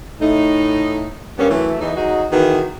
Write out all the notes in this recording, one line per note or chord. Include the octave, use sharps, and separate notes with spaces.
A2 A3 D#4
G2 A#3 B3 C#4
E3 F#3 A3
E2 E3 D#4
F#3 D#4 F#4 G#4
D#3 E3 B3 F#4 G#4